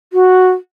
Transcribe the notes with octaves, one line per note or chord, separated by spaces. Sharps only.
F#4